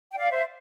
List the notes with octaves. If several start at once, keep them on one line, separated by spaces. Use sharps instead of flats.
G5
D5 F5
C5 E5